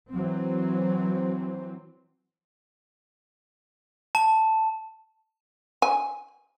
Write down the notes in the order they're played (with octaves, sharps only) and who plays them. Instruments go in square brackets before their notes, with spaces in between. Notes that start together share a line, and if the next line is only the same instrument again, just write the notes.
[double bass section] E3 F#3 C4
[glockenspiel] A5
[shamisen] G#5